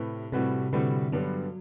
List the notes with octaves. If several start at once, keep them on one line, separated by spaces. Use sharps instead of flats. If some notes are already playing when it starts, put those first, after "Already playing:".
Already playing: A2 C3 C4 B4
A2 C3 G3 C4 F#4 B4
A2 D3 G3 C4 F#4 B4
G2 D3 F#3 G3 B3